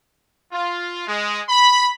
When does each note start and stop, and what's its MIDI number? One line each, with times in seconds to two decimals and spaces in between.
0.51 1.05 65
1.07 1.39 56
1.49 1.89 83